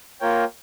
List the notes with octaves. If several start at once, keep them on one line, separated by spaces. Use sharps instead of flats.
A#3 F4 A#4 C#5 G5